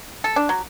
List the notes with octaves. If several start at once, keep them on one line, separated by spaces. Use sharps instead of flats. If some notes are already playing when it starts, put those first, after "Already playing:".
A4
D4
F#3